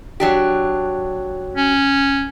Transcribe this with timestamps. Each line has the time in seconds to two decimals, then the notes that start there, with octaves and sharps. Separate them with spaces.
0.20 F#3 D4 G4
1.57 C#4